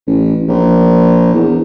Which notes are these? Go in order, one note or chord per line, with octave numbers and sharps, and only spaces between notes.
A1
A#1
E2